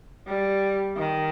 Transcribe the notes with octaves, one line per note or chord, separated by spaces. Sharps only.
G3
D#3